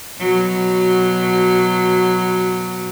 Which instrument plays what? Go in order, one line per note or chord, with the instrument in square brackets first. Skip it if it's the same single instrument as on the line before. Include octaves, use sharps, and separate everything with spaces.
[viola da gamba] B2 F#3